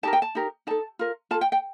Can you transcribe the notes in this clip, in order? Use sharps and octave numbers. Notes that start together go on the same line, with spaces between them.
D#4 G4 A#4 A5
G5
A5
D#4 G4 A#4
D#4 A4 A5
F4 A#4
F4 A4 A5
G5
G5